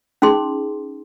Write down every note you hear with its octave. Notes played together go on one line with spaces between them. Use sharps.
C#4 D#4 G#4 C6